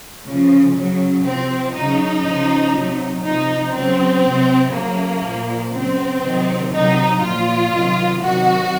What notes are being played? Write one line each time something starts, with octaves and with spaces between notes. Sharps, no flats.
C#3 F3
C#3 F#3
C3 F3 C4
C#3 F#3 D#4
C#3 F3
C3 F#3
C3 F3 D#4
C#3 F#3 C4
C3 F#3
C#3 F#3 A#3
A#2 F3
C#3 F#3 C4
C3 D#3 F#3
C3 D#3 F#3 D#4
A#2 F3 F4
C3 D#3 F#3
C3 D#3 F#3 F#4